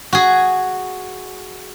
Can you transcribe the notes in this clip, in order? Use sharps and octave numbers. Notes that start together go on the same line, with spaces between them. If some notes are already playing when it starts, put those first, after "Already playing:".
F#4 G#4